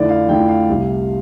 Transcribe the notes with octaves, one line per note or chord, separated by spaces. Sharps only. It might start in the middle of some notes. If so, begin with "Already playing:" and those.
Already playing: F2 D3 A3 E4 D5
F5
F2 D3 A3 E4 G5
F5
C2 C3 G3